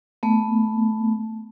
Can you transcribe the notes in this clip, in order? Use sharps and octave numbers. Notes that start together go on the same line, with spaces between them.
A3 B3